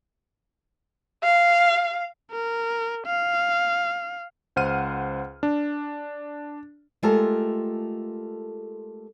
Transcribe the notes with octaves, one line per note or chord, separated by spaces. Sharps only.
F5
A#4
F5
C#2 C5 F#5 F6 D#7
D4
G#3 A3 F4 G4 A4 A#4